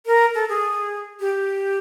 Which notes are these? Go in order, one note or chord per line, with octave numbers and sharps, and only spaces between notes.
A#4
A4
G#4
G4